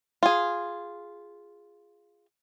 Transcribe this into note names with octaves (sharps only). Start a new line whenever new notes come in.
F4 G#4